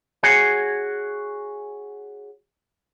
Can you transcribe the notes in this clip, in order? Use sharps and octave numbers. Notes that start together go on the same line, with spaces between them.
F#4 G#4 C#5 G#5